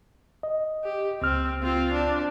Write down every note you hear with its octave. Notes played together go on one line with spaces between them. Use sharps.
D#5
G4
C#2 C4 F6
C4 F4
D4